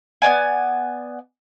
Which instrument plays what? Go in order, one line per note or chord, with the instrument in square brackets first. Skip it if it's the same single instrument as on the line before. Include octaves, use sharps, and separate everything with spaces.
[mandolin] B3 C#5 D5 G#5